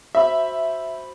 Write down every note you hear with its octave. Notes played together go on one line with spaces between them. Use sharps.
F#4 C5 E5 B5